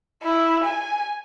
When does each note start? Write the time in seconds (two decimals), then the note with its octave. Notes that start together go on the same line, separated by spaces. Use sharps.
0.23 E4
0.64 G#5